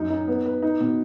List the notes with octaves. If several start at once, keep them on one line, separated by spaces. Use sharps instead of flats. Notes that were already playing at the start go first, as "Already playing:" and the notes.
Already playing: F#2 D#4
D#4
B3
B4
D#4
B2